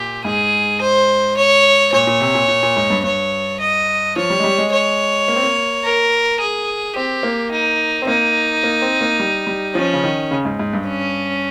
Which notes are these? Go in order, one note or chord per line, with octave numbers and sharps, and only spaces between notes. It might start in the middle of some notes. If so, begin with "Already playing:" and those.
Already playing: A#2 G4
G#2 G#4
C5
C#5
A#2 C#5
A#2
C3
A#2
A#2
A#2
G#2
G2
G2 C#5
D#5
F3 C#5
G3
G#3
G3
G#3
C#5
A#3
C4
A#3
A#4
G#4
C4 G4
A#3
D#4
C4
A#3 D#4
A#3
C4
A#3
G3
G3
F3 C#4
C#3
D#3
C#3
G#2
G#2
G2
C#4